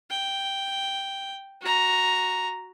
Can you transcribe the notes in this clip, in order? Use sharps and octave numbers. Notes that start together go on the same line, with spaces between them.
G5
F#4 A#5